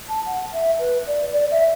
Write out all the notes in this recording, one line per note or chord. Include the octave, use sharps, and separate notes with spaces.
A5
F#5
E5
B4
D5
D5
E5